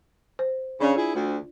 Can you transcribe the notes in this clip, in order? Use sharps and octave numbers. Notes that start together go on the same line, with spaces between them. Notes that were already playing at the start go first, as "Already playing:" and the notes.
C5
C#3 D4 D5
E4 F4 G#4
D2